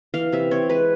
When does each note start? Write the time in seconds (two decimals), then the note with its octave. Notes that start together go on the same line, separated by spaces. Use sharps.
0.14 E3 F5
0.32 C3 E5
0.51 C4 C#5
0.69 G#3 B4